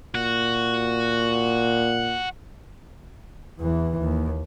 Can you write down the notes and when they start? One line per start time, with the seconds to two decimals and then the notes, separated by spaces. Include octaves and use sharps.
0.15 A#2 F#4
3.59 E2 E3
3.99 D#2